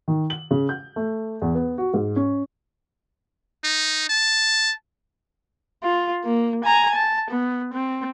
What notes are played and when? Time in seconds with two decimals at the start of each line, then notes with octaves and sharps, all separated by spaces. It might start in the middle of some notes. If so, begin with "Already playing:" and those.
0.08 D#3
0.30 F#7
0.51 C#3
0.69 G6
0.96 A3
1.42 E2
1.55 B3
1.78 F#4
1.94 G#2
2.16 C#4
3.64 D#4
4.09 A5
5.83 F4
6.25 A#3
6.65 G#5 A#5
6.95 A5
7.31 B3
7.74 C4